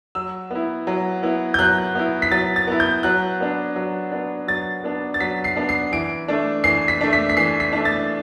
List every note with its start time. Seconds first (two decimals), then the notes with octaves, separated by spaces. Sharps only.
0.15 F#3 E6
0.51 B3 E4
0.87 F#3
1.23 B3 E4
1.54 G6
1.59 F#3 F#6
1.95 B3 E4
2.22 B6
2.31 F#3 A6
2.56 A6
2.68 B3 E4
2.80 G6
3.03 F#3 F#6
3.40 B3 D4
3.76 F#3
4.12 B3 D4
4.47 F#3 A6
4.84 B3 D4
5.14 A6
5.20 F#3 B6
5.44 C7
5.56 B3 D4
5.69 C7
5.92 E3 D7
6.28 A3 D4
6.64 E3 C7
6.88 B6
7.01 A3 D4
7.13 B6
7.29 B6
7.37 E3 C7
7.60 B6
7.72 A3 D4
7.85 A6